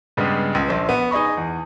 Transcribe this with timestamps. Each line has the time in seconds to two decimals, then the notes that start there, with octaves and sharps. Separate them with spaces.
0.17 G2 C#3 G3 G#3 B3
0.55 C#2
0.68 A#1 C5
0.89 B3
1.11 D#4 G#4 D#5 B5 C#6
1.37 E2